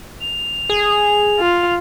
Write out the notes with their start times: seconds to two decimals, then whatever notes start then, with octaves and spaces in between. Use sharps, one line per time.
0.21 F7
0.70 G#4
1.39 F4